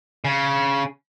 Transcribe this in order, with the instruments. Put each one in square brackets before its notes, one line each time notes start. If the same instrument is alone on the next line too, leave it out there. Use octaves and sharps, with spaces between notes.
[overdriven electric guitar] C#3